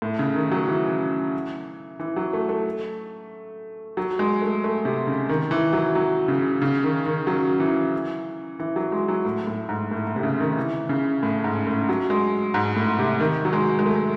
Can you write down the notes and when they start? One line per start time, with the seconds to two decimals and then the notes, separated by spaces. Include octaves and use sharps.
0.02 A2
0.19 C#3
0.35 D#3
0.51 F#3
0.68 E3
1.99 E3
2.16 F#3
2.33 A3
2.49 A3
3.97 F#3
4.19 G#3
4.42 A3
4.64 A3
4.85 C3
5.07 C#3
5.29 D#3
5.51 E3
5.73 F#3
5.95 F#3
6.28 C#3
6.62 C#3
6.83 D#3
7.06 D#3
7.27 F#3
7.60 E3
8.59 E3
8.76 F#3
8.92 G#3
9.08 F#3
9.25 A2
9.47 A2
9.69 G#2
9.91 A2
10.07 A2
10.16 C3
10.23 C#3
10.40 D#3
10.57 E3
10.89 C#3
11.23 A2
11.44 G#2
11.67 A2
11.89 F#3
12.10 G#3
12.54 G#2
12.76 A2
12.99 C3
13.20 D#3
13.45 F#3
13.53 G#3
13.79 G#3
13.86 A3